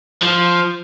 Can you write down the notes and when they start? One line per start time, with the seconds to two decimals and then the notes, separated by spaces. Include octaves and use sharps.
0.23 F3